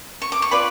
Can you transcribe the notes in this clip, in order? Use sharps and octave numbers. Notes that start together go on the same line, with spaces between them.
C#6
D6
C#6
F4 B4 D5 B5